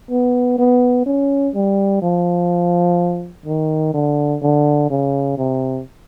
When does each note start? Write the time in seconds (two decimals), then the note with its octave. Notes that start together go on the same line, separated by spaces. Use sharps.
0.11 B3
0.58 B3
1.06 C#4
1.55 G3
2.02 F3
3.46 D#3
3.94 D3
4.42 D3
4.90 C#3
5.38 C3